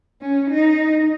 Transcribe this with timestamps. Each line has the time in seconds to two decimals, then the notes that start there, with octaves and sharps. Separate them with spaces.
0.21 C#4
0.51 D#4